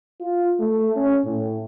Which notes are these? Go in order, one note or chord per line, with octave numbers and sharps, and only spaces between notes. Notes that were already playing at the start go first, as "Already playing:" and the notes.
F4
A3
C#4
A2